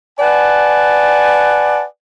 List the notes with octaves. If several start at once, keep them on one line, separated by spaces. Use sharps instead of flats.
B4 D5 F#5 G#5 A5